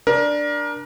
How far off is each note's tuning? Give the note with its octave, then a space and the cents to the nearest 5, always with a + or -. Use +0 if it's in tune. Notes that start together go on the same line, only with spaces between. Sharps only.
D4 +5 A#4 +25